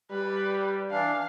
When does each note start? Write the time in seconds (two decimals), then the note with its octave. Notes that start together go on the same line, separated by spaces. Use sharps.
0.11 G3 B4
0.91 E3 D4 F5